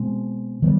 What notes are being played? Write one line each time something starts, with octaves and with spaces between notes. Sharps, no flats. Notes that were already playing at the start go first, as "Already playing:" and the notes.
Already playing: B2 G#3 C4
D#3 G3 B3